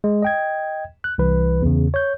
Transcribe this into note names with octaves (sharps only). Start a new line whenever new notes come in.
G#3
D#5 G5 G#6
F#6
C2 E3 B4
E2 C#3
C#5 G6